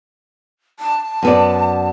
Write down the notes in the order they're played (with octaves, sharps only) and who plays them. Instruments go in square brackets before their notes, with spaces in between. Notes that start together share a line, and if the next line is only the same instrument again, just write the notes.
[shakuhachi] A5
[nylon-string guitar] F#2 B3 D5